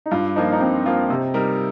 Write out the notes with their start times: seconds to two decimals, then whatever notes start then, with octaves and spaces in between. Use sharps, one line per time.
0.06 D#4
0.11 G2 F4
0.36 F3 A#3 D#4 F4
0.52 D#4
0.60 G2 C4
0.86 F3 A#3 F4
1.10 C3
1.34 G3 D#4 A#4